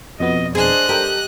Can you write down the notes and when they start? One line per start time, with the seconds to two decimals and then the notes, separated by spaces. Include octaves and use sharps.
0.20 F2 B2 B3 D#5
0.55 D4 G#4 C5 D#5 F#6
0.89 G4 A4 A#4